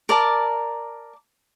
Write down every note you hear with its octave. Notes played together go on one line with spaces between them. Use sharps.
A#4 D5 A5